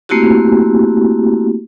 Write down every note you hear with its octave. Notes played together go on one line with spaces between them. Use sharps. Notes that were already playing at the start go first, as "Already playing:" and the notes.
A3 A#3 C4 E4 F#4 G4